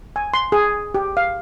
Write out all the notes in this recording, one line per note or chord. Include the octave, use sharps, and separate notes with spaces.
G#5
C6
G#4
G4
F5